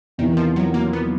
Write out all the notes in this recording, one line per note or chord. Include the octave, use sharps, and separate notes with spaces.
E2 C3 D#3 E3
F3
F#3
A#3
B3